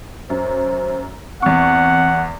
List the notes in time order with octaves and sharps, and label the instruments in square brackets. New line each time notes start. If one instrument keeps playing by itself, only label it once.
[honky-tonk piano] F#2 [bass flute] C5
[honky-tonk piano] E2 C#6 [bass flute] C4 [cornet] F#5